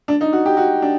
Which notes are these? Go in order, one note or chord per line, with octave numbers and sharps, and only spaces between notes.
D4
D#4
F#4
G4
F#4
D4